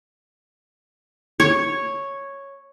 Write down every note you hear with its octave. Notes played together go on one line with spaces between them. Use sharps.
C#5